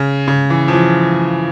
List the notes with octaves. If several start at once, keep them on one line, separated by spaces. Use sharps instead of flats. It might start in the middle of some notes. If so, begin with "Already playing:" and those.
Already playing: C#3
C#3
E3
F3
E3